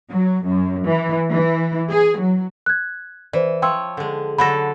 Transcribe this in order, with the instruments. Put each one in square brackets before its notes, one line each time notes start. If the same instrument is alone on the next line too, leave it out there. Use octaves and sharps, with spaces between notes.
[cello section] F#3
F#2
E3
E3
G#4
F#3
[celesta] F#6 G#6
[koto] E3 [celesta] C5 D5
[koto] F3 C#5 [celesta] G5 C6 E6
[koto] D3 G#3
[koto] D3 F#3 A4 [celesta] B5 A#6